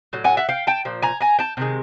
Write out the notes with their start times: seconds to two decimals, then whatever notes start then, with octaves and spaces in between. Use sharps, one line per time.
0.13 A2 F#3
0.24 F#5 G#5
0.37 E5 F#5
0.49 F5 G5
0.67 G5 A5
0.85 A#2 F3
1.02 G#5 A#5
1.21 G#5 A#5
1.39 G5 A5
1.57 C3 D#3 G#3